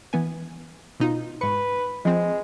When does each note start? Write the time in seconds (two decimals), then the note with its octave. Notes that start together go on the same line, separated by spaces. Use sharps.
0.13 E3 B3 G#5
1.00 B2 D#4 F4
1.41 G#2 B4 C#6
2.05 F3 G#3 C4